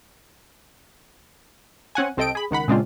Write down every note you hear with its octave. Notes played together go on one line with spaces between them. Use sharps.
C4 C#4 F#5 G#5
C2 C4 A4 D#5 G5 D7
G#4 B5
C#2 D#3 F#5 B5
A#2 C#3 G#3 C4 D4 F4